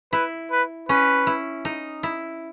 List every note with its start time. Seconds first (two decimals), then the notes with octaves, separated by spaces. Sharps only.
0.13 E4 B4
0.51 B4
0.89 C#4 B4
1.27 E4
1.65 D#4
2.03 E4